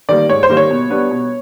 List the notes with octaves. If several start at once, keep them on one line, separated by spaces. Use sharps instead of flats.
D#3 G3 A#3 D5
G#2 C#5
C5
D#3 G3 A#3
C#5
B2
G3 B3 D4
B2